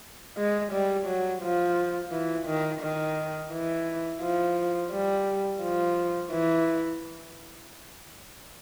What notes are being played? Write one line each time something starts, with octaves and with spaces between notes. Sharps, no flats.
G#3
G3
F#3
F3
E3
D#3
D#3
E3
F3
G3
F3
E3